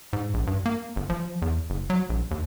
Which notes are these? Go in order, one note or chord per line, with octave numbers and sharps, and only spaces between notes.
G#2
A#1
G2
A#3
G1
F3
E2
F#1
F#3
A#1
D#2